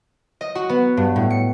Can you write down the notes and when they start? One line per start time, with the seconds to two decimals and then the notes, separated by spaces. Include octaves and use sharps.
0.41 D#5
0.55 F#4
0.69 B3
0.97 G2
1.16 A2
1.30 C#7